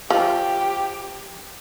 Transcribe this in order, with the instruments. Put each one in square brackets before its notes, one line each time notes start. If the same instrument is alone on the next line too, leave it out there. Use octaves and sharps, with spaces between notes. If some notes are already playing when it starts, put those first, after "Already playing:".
[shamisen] F3 [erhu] G4